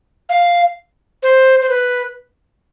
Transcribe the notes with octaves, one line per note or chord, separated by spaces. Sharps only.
F5
C5
C5
B4